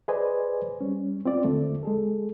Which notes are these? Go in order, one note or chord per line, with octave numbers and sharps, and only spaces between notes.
G#4 B4 C5 D5 D#5 G#5
G3 C#4
C4 F4 D5
D#2 D3 A3
G#3 G#4 A4